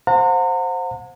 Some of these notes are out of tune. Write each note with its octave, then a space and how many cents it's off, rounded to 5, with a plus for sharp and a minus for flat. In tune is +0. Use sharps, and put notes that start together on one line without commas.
C5 +0 F#5 -40 A#5 -35